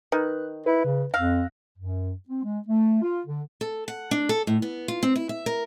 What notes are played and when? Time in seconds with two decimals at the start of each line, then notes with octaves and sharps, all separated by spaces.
0.12 D#3 B4 D#5 F#6
0.66 E4 B4
0.85 C#3
1.14 F2 F5 E6 F#6 A#6
1.78 F#2
2.29 C4
2.44 G#3
2.68 A3
3.02 F4
3.27 D3
3.61 A4
3.88 F#5
4.11 D4
4.29 A4
4.47 A2
4.62 B3
4.88 F4
5.03 C4
5.16 E4
5.29 E5
5.46 A#4